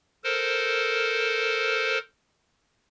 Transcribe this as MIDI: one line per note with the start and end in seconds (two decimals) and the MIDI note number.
0.24 1.98 69
0.24 1.98 70
0.24 1.98 72